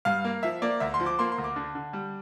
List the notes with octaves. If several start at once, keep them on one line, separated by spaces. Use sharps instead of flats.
G2 F5
A#3
F3 E5
A#3 D5
D2 E5
C6
F3
D6
A#3 C6
C6
D2
D6
D3
D3
G3